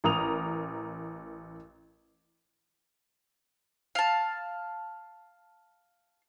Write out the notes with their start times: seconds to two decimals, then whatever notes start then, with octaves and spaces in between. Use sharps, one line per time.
0.04 A1 A#4 A#5 D#6 F7
3.95 F5 A5